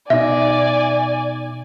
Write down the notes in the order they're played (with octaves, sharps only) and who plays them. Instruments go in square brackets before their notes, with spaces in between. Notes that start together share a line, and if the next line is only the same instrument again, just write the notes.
[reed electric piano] B2 D#4 [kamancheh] D5 G#5 [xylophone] E5